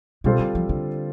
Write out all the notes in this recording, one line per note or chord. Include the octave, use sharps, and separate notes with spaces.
B2 G3 C4 F4 A4 C5
D3
F3
D3